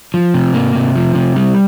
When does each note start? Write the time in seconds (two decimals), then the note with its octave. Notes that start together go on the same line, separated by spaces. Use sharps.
0.14 F3
0.34 C3
0.54 A#3
0.75 C3
0.96 F3
1.15 C3
1.36 G3